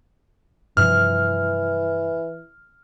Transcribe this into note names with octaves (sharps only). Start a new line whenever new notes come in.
G2 C3 E3 F3 F6